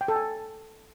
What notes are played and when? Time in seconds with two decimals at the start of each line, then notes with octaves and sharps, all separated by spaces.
0.01 G5
0.08 A4
0.16 G#5